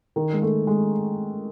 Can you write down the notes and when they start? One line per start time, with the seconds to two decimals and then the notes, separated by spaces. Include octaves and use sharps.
0.16 D#3
0.32 G#3
0.42 A3
0.67 G#3